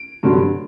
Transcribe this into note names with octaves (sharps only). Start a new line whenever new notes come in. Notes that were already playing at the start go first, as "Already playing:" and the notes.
Already playing: D7
G2 D3 F#3